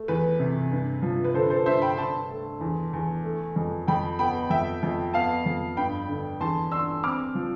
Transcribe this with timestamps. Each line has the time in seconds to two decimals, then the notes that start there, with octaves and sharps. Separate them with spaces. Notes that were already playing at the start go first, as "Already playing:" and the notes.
Already playing: A3
0.08 E2 B4
0.40 C3
0.72 G2
1.02 F3
1.24 B4
1.34 D3 A4 C5
1.43 B4
1.50 A4 C5
1.66 G2 C5 E5
1.82 G5 B5
1.97 D3 A5 C6
2.30 A3
2.61 E2
2.93 E2
3.24 A3
3.56 F2
3.88 F2 G5 B5
4.19 B3 G5 B5
4.50 F2 E5 G5
4.83 F2
5.14 B3 F5 A5
5.46 F2
5.77 G2 G5 B5
6.09 D3
6.40 E2 A5 C6
6.72 D4 C6 E6
7.04 C4 D6 F6
7.35 F3